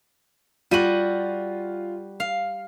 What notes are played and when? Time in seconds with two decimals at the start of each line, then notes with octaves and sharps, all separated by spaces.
0.71 G3 F4 F#4 D#7 F#7
2.20 F5